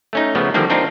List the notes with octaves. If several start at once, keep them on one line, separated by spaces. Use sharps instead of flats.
A3 C#4 D#4
C#3 F3 A3 B3
D3 D#3 F3 G3 A#3 D4
C4 D4 D#4 F4 A#4